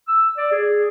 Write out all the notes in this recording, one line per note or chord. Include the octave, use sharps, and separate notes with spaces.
E6
D5
G#4